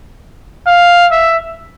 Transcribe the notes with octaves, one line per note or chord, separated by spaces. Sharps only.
F5
E5